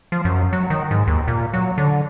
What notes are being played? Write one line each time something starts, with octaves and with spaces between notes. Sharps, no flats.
F3
F#2
F#3
D#3
G#2
D#2
A#2
F#3
D3